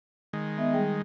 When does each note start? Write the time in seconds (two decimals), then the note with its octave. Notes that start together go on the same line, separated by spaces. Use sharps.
0.33 D#3 G#3
0.58 B3 D#5 E5
0.73 G3 G#4 G5